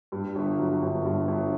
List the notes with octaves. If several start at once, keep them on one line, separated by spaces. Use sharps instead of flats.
G2
G1
F#3
G1
G2
G1